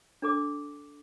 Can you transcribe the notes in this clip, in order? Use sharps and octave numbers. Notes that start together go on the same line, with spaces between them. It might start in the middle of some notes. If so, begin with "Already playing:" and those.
D4 A4 D6